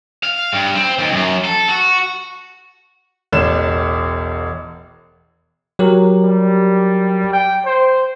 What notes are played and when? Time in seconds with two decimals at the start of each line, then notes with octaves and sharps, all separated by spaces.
0.23 F5
0.53 G2
0.75 C4
0.99 D#2
1.12 F#2
1.44 A4
1.69 F#4
3.33 E1 A1 E7
5.79 F#3 G4 A#4
6.23 G3
7.33 G5
7.66 C5